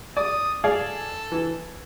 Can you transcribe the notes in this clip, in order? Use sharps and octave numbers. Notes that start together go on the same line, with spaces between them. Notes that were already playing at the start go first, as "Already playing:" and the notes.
D5 D#6
G#4 A4 D5 F5
E3